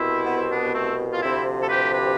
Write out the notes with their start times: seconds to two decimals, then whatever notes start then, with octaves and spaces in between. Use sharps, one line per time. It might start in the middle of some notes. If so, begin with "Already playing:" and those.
Already playing: C2 B2 C4 E4
0.25 B3
0.37 C4
0.50 B3 D4
0.74 A3 C4
1.13 F4
1.22 D2 C3 F3 C4 E4
1.62 A4
1.69 G4 B4
1.93 G4 B4